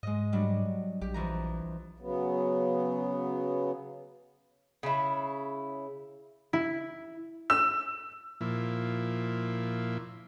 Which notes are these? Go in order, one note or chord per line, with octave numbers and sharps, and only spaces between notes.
G#2 G#3 D#5
F#3 G3 D4
A#1 G4
F2 E3 A#5
C#3 F#3 B3
C#3 E4
E4
E6
A#2 F3 E4